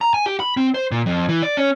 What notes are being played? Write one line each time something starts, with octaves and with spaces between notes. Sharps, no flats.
A#5
G#5
G4
B5
C4
C5
A#2
F2
E3
D5
C#4